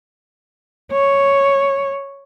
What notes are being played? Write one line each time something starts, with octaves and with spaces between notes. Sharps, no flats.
C#5